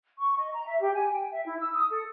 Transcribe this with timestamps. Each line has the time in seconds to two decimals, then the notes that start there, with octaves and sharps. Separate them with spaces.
0.19 C#6
0.37 D#5
0.53 A#5
0.67 E5
0.81 G4
0.94 G#5
1.11 G5
1.32 E5
1.45 E4
1.60 E6
1.74 D#6
1.90 A4